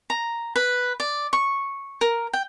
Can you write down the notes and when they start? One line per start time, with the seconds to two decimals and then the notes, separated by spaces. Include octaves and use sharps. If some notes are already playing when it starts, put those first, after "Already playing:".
0.10 A#5
0.56 B4
1.00 D5
1.33 C#6
2.01 A#4
2.33 G5